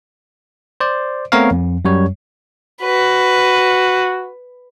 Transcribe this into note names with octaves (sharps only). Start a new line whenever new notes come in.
C5 D5
A3 B3 C4 A#4 C#5 F5
F2
F#2 G3 C#5
F#4 B4